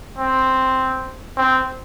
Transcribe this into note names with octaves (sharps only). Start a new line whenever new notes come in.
C4
C4